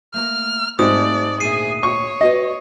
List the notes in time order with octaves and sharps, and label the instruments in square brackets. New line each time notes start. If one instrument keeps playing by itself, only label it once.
[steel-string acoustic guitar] A3 A#3 A#5 [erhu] F6
[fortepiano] G#2 C4 [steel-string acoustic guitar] G3 A3 A4 [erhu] D5 [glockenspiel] D#6
[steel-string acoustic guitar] D2 A#2 E5 [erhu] G#4 [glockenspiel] C7 D#7
[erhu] C#5 [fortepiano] C#6
[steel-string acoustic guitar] F#4 B4 D5 [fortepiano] D#5